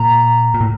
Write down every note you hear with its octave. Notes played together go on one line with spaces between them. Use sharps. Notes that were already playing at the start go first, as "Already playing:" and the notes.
Already playing: A#2 A#5
A#2
A2